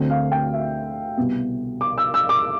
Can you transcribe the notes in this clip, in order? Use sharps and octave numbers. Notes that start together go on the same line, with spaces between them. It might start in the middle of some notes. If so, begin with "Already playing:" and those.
Already playing: D2 D3 A3 C4
F5
G5
E5
C2 B2 B3
D6
E6
E6
D6